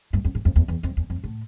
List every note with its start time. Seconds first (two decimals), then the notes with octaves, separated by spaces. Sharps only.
0.13 G2
0.25 F2
0.35 A2
0.45 F2
0.56 E2
0.68 E2
0.83 F2
0.97 E2
1.10 F2
1.24 A2